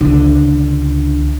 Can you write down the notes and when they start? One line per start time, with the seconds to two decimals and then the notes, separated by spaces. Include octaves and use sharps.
0.01 C#2 D3